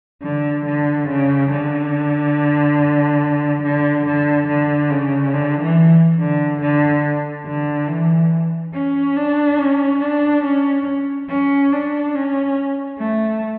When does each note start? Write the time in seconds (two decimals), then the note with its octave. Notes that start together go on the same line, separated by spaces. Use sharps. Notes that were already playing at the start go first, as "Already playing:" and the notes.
0.22 D3
0.66 D3
1.08 C#3
1.51 D3
3.63 D3
4.06 D3
4.48 D3
4.90 C#3
5.34 D3
5.61 E3
6.19 D3
6.61 D3
7.46 D3
7.88 E3
8.74 C#4
9.16 D4
9.59 C#4
10.01 D4
10.44 C#4
11.29 C#4
11.72 D4
12.15 C#4
12.99 A3